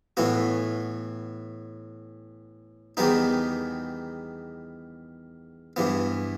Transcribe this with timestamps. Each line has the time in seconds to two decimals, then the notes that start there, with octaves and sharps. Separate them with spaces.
0.17 A2 E3 B3 F#4
2.97 E2 D#3 G3 B3 D#4
5.76 G2 E3 B3